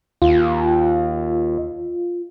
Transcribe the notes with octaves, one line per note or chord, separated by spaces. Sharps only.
D#2 F4